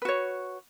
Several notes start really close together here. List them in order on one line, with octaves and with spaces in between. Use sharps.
B4 F#4 C#5